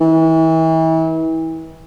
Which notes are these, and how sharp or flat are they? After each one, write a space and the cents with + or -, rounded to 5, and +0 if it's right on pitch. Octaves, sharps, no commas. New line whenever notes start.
E3 -35